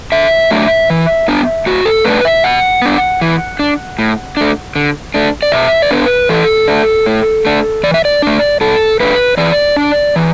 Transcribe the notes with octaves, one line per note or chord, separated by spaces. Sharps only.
D3 E5
F#3 A3 D4
E3
B3 D4
A2 F#4
A4
A3 D4 B4
E5
B2 F#5
B3 D4
E3
D4
A2
A3 D4
D3
A3 D4
D5
B2 E5
D5
B3 D4 B4
E3 A4
A3 D4
A2
A3 D4
E3 D5
E5
D5
A3 D4
B2 A4
A3 D4 B4
E3 D5
D4
E3